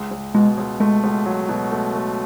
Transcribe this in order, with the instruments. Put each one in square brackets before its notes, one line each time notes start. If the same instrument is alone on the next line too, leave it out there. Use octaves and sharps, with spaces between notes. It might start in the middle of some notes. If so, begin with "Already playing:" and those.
Already playing: [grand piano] C#2
C#2
[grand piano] B2 [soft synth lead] G#3
[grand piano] C#2
[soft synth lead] G#3 [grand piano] A3
[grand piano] C#2
F#3
B2
A3
A3